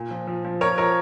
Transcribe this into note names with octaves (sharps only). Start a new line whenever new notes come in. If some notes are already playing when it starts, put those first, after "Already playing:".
Already playing: A#2
F3
F3
F3
F3 A#4 C#5
F3 A#4 C#5